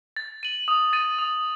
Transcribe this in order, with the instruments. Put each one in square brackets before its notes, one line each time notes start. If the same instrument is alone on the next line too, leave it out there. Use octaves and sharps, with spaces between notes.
[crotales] A6
D#7 F#7
D#6
A6 D#7
D#6